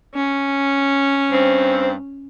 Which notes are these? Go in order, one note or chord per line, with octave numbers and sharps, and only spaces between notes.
C#4
G2 C4